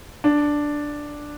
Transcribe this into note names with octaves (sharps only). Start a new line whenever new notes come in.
D4